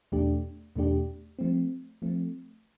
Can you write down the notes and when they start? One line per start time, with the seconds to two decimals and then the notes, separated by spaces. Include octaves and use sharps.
0.12 E2 B2 A3 D4 G4
0.76 E2 B2 A3 D4 G4
1.39 F3 A3 C4
2.02 F3 A3 C4